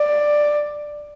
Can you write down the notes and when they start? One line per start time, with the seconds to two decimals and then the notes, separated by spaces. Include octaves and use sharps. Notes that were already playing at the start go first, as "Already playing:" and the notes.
Already playing: D5